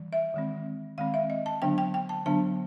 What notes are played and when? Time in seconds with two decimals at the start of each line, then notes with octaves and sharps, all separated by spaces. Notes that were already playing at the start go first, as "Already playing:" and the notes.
Already playing: E3 G3
0.13 E5
0.34 D#3 G#3 C4
0.98 D#3 G#3 C4 F5
1.14 E5
1.30 D#5
1.46 A5
1.62 D3 F#3 B3 D4 G5
1.78 G5
1.94 G5
2.09 A5
2.26 D3 F#3 B3 D4 A5